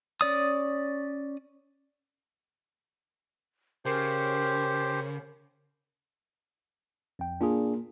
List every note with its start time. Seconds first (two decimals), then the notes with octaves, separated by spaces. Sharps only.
0.21 C#4 D5 D#6
3.85 C#3 G4 A#4 C5
7.19 F2 G5
7.41 A#2 D4 F4 G#4